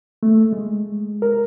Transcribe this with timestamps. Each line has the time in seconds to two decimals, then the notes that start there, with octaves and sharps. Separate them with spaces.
0.23 A3
0.53 G#3
1.22 A#4